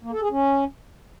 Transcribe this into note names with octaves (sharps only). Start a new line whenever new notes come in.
A#3
A4
G#4
C#4